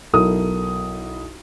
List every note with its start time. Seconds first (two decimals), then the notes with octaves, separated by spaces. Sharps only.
0.13 B1 E4 A4 A#4 D#6